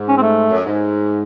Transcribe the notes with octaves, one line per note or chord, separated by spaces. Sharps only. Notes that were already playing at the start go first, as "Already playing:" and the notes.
Already playing: G#2
C#4
C4
A3
F#2
G#2